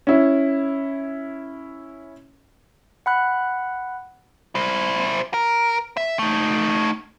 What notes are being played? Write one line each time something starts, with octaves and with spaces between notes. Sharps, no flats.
C#4 E4
F#5 B5 F#6
E4 C5
A#4
E5
A3 D#4